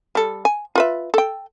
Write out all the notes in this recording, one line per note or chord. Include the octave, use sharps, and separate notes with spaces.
G3 A4
G#5
F4 B4 E5
A4 G5